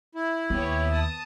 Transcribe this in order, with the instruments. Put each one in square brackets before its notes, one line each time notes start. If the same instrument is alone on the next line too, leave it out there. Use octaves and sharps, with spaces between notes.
[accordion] E4
[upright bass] D#2 [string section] B3 G4 C#5
[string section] A5 D#6